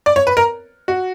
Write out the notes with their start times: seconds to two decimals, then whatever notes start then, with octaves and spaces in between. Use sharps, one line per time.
0.06 D5
0.16 C#5
0.27 B4
0.37 A#4
0.88 F#4